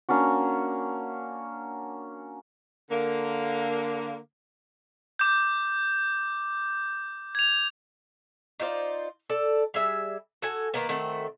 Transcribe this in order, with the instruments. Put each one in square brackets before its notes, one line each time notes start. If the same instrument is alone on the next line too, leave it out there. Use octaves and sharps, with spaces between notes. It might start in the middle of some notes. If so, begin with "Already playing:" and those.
[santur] A#3 C#4 D4 F#4
[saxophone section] D3 A#3
[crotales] D6 G6
G#6 F7
[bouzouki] D#4 F4 C5 D5
A4 D5 A5
G3 G#4 E5
F#4 A4 G#5
D#3 A#3 B3
D#3 A3 C4 F#4